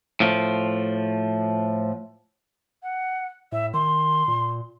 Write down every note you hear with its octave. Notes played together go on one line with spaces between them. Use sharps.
A2 F3
F#5
A2 E5
D#3 C6
A#2